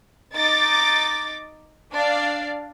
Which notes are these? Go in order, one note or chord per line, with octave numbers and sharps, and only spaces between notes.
D#4 D6 A6
D4 D5 F5